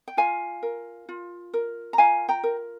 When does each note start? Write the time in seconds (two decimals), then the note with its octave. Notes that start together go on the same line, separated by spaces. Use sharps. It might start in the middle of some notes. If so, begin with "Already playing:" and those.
0.08 G5
0.17 F4 F5 G#5
0.63 A#4
1.09 F4
1.53 A#4
1.93 A#5
1.98 F4 F5 G#5
2.29 G5 A#5
2.43 A#4